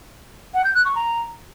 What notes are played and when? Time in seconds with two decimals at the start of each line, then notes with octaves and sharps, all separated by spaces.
0.54 F#5
0.64 G6
0.75 F#6
0.85 C#6
0.95 A#5